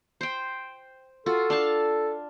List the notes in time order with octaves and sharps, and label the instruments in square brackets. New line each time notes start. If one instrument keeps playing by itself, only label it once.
[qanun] C5 G5
[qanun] F4 F#4 [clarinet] A4
[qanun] D4 F5 A5